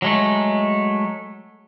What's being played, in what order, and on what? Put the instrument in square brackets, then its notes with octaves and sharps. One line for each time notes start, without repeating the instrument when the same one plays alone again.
[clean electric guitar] F#3 G#3 A3